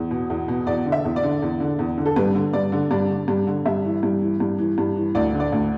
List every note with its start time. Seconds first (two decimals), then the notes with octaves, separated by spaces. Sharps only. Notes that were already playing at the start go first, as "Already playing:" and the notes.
Already playing: E2
0.11 B2
0.30 E2
0.48 B2
0.67 E2 D5
0.86 D3
0.92 E5
1.05 E2
1.16 D5
1.23 D3
1.42 E2
1.60 D3
1.79 E2
1.98 D3
2.06 A4
2.16 G2 B4
2.35 D3
2.53 G2 D5
2.72 D3
2.91 G2 D5
3.10 D3
3.28 G2
3.47 D3
3.66 G2 E5
3.85 E3
4.03 G2
4.22 E3
4.40 G2
4.58 E3
4.78 G2
4.96 E3
5.15 D2 D5
5.34 D3
5.40 D5
5.52 D2